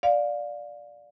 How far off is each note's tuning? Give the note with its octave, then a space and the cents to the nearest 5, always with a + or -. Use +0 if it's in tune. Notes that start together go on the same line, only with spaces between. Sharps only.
D5 +0 F5 +20